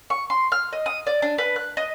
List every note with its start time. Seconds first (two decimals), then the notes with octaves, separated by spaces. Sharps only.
0.10 C#6
0.30 C6
0.52 F6
0.73 D#5
0.86 D#6
1.07 D5
1.22 D4
1.38 B4
1.56 F#6
1.77 D#5